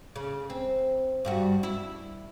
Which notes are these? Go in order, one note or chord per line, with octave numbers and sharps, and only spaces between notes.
C#3
C4
G2 G3 F#4
E4